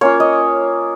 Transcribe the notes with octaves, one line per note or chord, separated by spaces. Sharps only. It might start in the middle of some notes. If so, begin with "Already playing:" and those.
A#3 C#4 F4 C#5
D#5